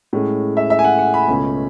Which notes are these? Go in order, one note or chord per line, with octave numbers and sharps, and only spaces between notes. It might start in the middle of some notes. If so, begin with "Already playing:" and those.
A2 G#3 C#4
E5
E5
G#5
F#5
F#5
B5
C#2 B2 A3 C#4